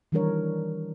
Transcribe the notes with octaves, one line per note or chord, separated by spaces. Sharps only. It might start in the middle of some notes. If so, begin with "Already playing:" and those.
D#3 E3 G3 D4 A#4 C#5